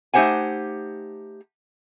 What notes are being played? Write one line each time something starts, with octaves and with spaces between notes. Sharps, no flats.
A3 D#4 G4 C5 F#5 G#5